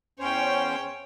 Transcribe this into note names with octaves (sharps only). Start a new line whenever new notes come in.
E2 C#4 C5 C#5 G5